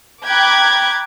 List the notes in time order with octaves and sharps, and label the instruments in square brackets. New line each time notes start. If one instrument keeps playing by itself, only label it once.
[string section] G5 A#5 B5 D6 F#6 G#6